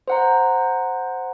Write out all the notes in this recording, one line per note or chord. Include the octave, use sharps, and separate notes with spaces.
C5 F#5 A#5